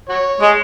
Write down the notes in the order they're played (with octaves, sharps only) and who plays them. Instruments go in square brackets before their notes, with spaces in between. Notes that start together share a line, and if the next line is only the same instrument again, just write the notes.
[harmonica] F#4 C#5
[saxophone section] G#3